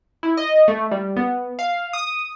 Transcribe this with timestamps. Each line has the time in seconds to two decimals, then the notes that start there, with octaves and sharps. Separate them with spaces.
0.23 E4
0.37 D#5
0.68 A3
0.91 G3
1.16 B3
1.59 F5
1.93 D#6